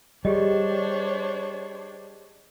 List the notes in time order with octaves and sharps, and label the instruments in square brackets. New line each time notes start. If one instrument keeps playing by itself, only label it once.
[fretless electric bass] G3 [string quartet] D4 C5 C#5 [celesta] G4 G#4 D#5